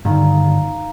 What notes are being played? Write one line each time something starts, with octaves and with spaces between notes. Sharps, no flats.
G2 D3 D#3 D#4 F5 A#5